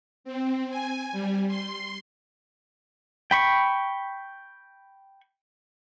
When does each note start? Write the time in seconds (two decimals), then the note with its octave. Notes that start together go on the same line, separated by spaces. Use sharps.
0.24 C4
0.70 G#5
1.12 G3
1.48 C6
3.31 G5 B5 C#6